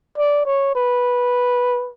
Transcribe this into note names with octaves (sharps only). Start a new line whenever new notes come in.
D5
C#5
B4